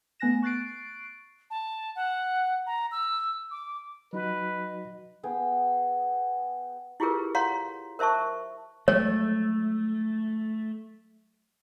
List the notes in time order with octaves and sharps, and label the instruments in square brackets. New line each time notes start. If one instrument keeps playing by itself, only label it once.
[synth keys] A3 B3 G#5 F#6 A#6 E7
C#6 F#6 A6 C7 D7
[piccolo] A5
F#5
A#5
E6
D6
[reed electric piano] F#3 D#4 F#4 [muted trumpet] B4 [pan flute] D#5
[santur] B3 G#4 G5 D#6
[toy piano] E4 F4 G4 G#4 A#4 B4
C#5 F5 F#5 A#5 C6
A#4 C5 E5 A5 C#6
[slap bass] F3 F#3 G#3 [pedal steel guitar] A3 [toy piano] C#5